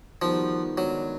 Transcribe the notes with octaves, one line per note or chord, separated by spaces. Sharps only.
D#3 F3 G3 B3 D#4 F#4
D#3 F#3 G#3 B3 D4